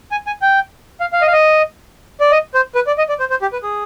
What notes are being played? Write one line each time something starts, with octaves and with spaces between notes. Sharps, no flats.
G#5
G#5
G5
F5
F5
D#5
F5
D#5
D5
D#5
C5
B4
D5
D#5
D5
C5
C5
G4
B4
G#4